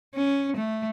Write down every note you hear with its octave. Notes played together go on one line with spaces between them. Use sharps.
C#4
A3